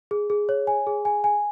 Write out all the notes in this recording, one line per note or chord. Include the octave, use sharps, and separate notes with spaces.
G#4
G#4
C#5
G#5
G#4
G#5
G#5